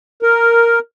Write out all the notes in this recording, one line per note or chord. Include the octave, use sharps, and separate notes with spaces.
A#4